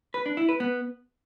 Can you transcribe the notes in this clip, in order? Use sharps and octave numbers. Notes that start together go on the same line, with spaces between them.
B4
D4
E4
B4
B3